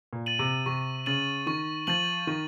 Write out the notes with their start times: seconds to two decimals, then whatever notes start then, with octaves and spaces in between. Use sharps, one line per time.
0.13 A#2
0.26 A6 D#7 F#7
0.39 C3
0.66 C3 C#6
1.06 C#3 A6 D#7 F#7
1.47 D#3 C#6
1.87 F3 A6 D#7 F#7
2.27 D#3 C#6